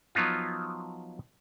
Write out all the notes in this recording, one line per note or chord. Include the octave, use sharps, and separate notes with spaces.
F3 F#3 B3 D#4 F4